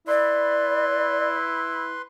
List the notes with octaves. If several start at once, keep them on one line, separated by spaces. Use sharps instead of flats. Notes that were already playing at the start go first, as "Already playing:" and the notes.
E4 B4 D5 C6